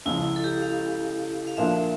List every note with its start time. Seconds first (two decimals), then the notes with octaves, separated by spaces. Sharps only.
0.06 C#2 C#3 F3 E4
0.24 E4
0.36 A4
0.44 G4
0.62 F5
1.47 F5
1.57 A#2 F3 A#3 D4 F4 E5